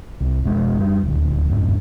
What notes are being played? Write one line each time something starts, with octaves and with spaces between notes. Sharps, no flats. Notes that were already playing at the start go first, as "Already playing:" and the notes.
C2
F1 B2 G#3
F#2 G3
D#1 D2
G1 F2 G#2